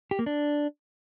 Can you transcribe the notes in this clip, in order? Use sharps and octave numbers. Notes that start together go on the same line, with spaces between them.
G4
A#3
D4